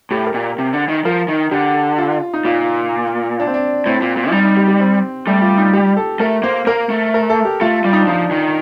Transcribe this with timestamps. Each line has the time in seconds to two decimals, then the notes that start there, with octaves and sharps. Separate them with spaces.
0.11 A2 G4
0.27 A#4
0.34 A#2
0.58 C3
0.73 D3
0.89 D#3
1.05 F3 A#4
1.28 D#3
1.51 D3 G4
1.98 F4
2.34 D#4
2.45 A#2 F4
3.40 D4
3.47 C4
3.54 D4
3.86 A2 C4
4.02 A#2
4.17 A#2
4.29 F3
4.32 G3 D#4
4.45 D#4
4.57 G4
4.68 G4
4.80 C4
5.27 G3 A3
5.42 F4
5.58 D#4
5.73 G4
5.97 A4
6.20 A3 A#4
6.43 A#3 C5
6.67 A#3 A#4
6.90 A3
7.14 A#4
7.30 A4
7.45 G4
7.61 A3 F4
7.84 G3 F4
7.93 D#4
8.01 D4
8.07 F3 D#4
8.31 D#3